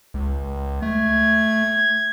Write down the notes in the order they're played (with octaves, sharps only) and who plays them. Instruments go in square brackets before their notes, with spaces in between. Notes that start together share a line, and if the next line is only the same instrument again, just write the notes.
[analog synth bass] C#2
[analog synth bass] A3 [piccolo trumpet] G#6